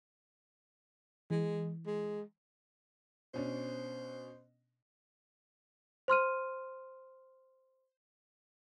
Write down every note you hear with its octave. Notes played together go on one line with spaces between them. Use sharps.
E3 G#3
G#3
B2 C#4 D4 C5
C5 C6 F6 D#7